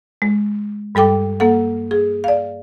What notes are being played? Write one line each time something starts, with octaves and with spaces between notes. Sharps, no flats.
G#3
G2 G3 A4 G5 D6
A#3 A4 F#5
G#4
D5 F5